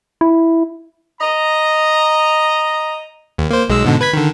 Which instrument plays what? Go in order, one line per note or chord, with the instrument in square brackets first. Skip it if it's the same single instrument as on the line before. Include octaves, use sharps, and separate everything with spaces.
[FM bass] E4
[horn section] D#5 A#5
[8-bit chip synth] D#2
A#3 C5
B1 G#3 E6
G#2 B2 D3
B4 G#6 B6
D3 D#3